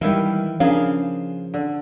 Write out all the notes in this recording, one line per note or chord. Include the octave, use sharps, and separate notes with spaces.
D#3 E3 G3 E4 A#4 F5
C#3 F3 D4 G#4 A#4 F5
D3